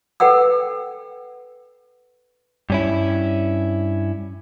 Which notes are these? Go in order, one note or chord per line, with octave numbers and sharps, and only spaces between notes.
A4 B4 F#5 G5 E6
G2 C#4 E4